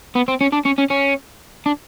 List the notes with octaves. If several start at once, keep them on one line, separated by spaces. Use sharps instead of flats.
B3
C4
C#4
D4
C#4
C#4
C#4
D4